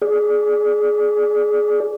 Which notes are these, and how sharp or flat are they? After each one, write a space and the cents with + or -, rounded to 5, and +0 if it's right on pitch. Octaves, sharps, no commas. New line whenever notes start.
G#4 +15 D5 +0